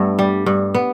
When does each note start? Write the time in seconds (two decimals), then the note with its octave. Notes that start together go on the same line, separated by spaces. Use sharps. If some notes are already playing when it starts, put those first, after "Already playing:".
Already playing: G2 A3 B3
0.19 G3
0.46 G2
0.74 B3